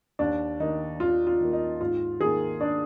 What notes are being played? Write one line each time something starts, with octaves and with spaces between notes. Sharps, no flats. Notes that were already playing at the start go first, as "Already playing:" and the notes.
D#2 D4
D#3 A#3 D#4
D#2 F4
F4
D#3 A#3
D#4
G#2 F4
D#3 A#3 G#4
D4